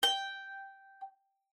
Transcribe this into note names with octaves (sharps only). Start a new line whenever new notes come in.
G5